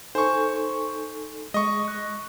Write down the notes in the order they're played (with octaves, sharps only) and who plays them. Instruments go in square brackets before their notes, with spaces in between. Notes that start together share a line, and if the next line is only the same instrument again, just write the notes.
[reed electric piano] D#4 A4 G#5 [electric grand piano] C5 C#6
[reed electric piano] G#3 [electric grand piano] D#5 C#6
[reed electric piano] F#6